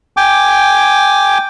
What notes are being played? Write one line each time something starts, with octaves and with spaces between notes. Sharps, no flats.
G5 G#5 D6